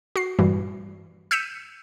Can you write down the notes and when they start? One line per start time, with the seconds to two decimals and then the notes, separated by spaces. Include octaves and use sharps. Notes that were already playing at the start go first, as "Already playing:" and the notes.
0.16 F#4 C7
0.39 G2 A#2 E3 G3 F#4
1.31 E6 G6 B6 C#7 D#7 E7